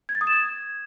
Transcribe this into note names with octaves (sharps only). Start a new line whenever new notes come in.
G#6
A6
D#6
E7
G#6